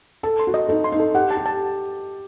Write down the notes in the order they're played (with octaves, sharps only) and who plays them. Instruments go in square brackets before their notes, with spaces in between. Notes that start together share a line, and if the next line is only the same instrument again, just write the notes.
[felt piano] A4 [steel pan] A5
[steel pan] C6
[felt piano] F#4
[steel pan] D#5
[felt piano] D#4 [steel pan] A4
[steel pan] C6
[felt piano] D#4
[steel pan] A4
[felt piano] G4 [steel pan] F#5
[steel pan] A5
[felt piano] G4
[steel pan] A5